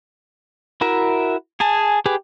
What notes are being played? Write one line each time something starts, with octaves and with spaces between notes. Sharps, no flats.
E4 F#4 A#4 E5
G#4 G#5 A5
G4 G#4 B4 D6